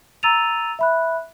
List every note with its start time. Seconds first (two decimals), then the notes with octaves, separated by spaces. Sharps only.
0.23 A#5 E6 A6 D#7 F7
0.79 E5 B5 F#6